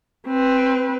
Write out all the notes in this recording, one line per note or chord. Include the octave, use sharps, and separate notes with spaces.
C4 B4